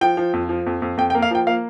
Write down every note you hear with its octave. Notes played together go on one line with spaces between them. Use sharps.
F3 G5
F3
F2
F3
F2
F2
F2 G5
G5
A#3
F5
F3 G5
A#3 F5